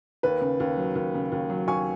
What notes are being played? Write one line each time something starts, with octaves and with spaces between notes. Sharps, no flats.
D#2 B4
C#3
D#2
F#3
D#2
C#3
D#2
F#3
D#2 G#5 C#6